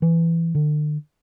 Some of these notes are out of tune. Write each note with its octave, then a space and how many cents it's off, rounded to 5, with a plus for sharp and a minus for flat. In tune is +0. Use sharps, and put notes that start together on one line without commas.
E3 +15
D3 +40